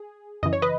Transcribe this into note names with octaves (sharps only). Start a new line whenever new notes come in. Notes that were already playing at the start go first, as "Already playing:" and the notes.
Already playing: G#4
F#2 C#3 E3 D#5
C#5
B4 D#5